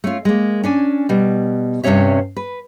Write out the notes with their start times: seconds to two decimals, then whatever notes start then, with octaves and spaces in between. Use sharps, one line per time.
0.04 A3 C#4 F4
0.25 G#3 A#3
0.64 C#4 D4 G#5
1.09 B2 G3
1.84 G2 C3 E3 C#4 C#5 E5
2.37 B4